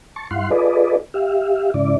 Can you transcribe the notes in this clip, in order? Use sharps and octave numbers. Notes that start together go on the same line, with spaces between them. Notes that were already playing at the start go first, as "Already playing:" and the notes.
A5 C#6
G2 E4 F5 F#5 C6
F4 G#4 A4 B4 D5 D#5
G4 E5 F5
G#2 C#3 E4 D5